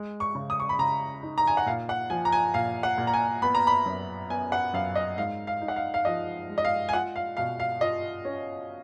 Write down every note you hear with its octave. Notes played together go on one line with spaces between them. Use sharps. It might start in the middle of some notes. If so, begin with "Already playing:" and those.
Already playing: G#3
C#6
C#3
D#6
C#6
B5
C#3 A#5
D#4
A#5
G#5
F#5
A#2 F5
F#5
F3 G#5
A#5
G#5
A#2 F5
F#5
A#2
A#5
G#5
B3 B5
A#5
B5
F#2
B3 G#5
F#5
F#2 F5
D#5
G#2 F5
F5
D#4
F#5
F5
F5
F3 D#5
G#3
D#5
F5
G#5
F4 F#5
F5
B2 F5
F5
F4 D#5
C#4